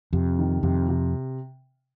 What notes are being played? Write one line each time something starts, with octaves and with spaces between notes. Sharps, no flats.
F2 C3
D#3
F2 C3
C3